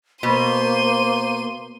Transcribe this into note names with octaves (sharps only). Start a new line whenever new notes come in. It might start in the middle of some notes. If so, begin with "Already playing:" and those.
B2 A#3 C5 C6 D#7